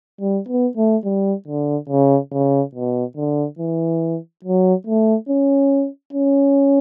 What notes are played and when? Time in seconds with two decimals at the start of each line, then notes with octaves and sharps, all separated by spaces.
0.20 G3
0.48 B3
0.77 A3
1.04 G3
1.47 D3
1.89 C#3
2.32 C#3
2.75 B2
3.16 D3
3.58 E3
4.44 F#3
4.86 A3
5.29 C#4
6.13 C#4